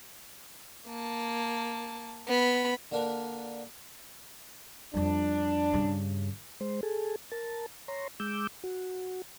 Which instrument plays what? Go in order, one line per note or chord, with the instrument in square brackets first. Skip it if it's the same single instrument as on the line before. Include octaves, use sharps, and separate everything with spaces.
[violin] A#3 A5
B3 B5
[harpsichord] D3 A#3 D4 A#4 B4
[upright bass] F2 G3 [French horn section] D4
[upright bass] G2 C#3
[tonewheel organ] G#3 C5
G#4 A4
A#4 A5
C#5 A#5 C6
G#3 D6 E6 G6
F#4